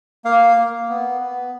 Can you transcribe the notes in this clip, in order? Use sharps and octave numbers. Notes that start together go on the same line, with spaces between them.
A#3 F5
A#3
B3
B3